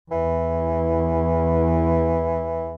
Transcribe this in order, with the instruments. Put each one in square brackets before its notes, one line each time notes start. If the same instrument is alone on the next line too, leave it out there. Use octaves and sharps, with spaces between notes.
[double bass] E2 [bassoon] E3